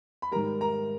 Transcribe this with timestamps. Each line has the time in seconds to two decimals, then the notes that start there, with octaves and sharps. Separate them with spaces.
0.22 B5
0.32 G#2 D#3 G3 A#4 A#5
0.61 A#4 A#5